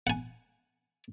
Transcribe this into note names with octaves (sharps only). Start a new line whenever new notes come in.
F#5 G#5